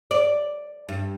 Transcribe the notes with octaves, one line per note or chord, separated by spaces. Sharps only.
D5
G2